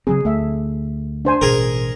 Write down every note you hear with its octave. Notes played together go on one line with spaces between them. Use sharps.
C#3 F#3 C4 G#4
D2 A3 E5
D4 C5 G#5
A1 B2 G#4 A#4